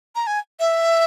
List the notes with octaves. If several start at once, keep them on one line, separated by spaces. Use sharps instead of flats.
A#5
G#5
E5